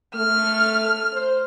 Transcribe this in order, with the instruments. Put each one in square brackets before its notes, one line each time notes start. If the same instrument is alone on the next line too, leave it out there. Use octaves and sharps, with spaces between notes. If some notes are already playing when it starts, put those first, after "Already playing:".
[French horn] A3 [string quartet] F6
[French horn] C5